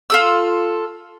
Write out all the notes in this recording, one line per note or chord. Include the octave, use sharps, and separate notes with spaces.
F4 A4 E6